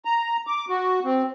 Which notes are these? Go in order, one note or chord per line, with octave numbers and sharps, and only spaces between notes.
A#5
D6
F#4
C4